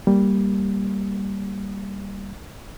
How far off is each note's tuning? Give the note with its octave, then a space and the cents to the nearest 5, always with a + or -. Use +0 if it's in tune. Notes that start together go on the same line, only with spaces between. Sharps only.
G3 +0 A#3 +0